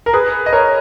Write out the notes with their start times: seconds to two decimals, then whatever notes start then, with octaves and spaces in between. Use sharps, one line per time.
0.06 A#4
0.13 G#4 B4
0.46 D#5
0.52 A#4 C#5